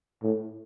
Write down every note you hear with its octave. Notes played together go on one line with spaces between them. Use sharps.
A2